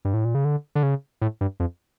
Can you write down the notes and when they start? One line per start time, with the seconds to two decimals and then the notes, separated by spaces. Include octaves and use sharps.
0.05 G2
0.14 A2
0.25 A#2
0.35 C#3
0.44 D3
0.75 D3
0.83 C#3
1.21 A2
1.41 G2
1.60 F2